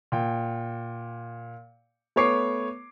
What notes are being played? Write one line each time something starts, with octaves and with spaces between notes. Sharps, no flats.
A#2 G5
A3 B3 C#5 D6 C7